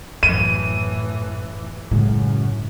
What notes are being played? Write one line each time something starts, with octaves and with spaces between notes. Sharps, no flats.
F#2 A2 E3 D#7
F#2 A2 C#3 G#3